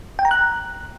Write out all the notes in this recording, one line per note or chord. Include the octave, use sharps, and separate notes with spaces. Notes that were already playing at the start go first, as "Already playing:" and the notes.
G5
A#5
F#6